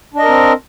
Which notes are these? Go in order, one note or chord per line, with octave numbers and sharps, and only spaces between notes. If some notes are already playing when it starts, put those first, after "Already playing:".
C4 D4 A#4 D#5